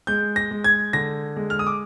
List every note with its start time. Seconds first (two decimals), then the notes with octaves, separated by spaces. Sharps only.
0.07 G#3 G6
0.36 A#6
0.51 G#3
0.64 G#6
0.93 D3 A#6
1.37 G#3
1.50 F6
1.59 D#6
1.67 D6